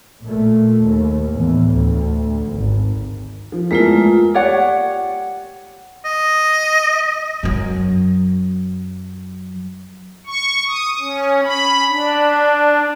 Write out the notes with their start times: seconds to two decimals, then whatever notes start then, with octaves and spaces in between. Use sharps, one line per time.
0.22 A#2 A3
0.83 D#2
1.29 E2 A2
1.71 D2
2.50 G#1
3.52 F3
3.71 E2 G#3 A3 E4 F4 A#4
4.34 G4 C#5 D5 F#5
6.05 D#5
7.43 F#2 F#3
10.27 C#6
10.68 D#6
10.99 C#4
11.45 B5
11.88 D4